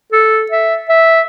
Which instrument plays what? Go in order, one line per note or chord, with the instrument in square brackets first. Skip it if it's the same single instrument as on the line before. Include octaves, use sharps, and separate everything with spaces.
[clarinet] A4
E5
E5